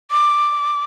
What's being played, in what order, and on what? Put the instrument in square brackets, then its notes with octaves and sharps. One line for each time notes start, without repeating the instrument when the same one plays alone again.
[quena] D6